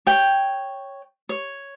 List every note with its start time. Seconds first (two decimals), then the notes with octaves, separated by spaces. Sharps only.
0.06 C#5 G5
1.29 C#5